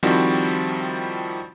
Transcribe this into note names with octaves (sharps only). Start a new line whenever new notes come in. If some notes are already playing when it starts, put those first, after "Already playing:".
D#3 F3 G3 C4 E4 F#4